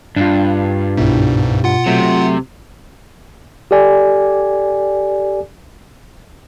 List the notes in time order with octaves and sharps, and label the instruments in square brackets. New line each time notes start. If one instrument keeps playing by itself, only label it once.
[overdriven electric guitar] G2 [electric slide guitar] D4 F4
[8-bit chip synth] C2 G#2 [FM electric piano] B2 E4
[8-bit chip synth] F4 F#5
[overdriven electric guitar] C3 [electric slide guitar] F#3 A3
[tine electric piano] G4 A4 D5 G#5